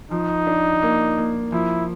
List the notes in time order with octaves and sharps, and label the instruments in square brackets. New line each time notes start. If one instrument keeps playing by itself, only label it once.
[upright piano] F3 [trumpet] D#4
[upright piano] D4
A#3
A#3
[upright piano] F3 [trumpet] E4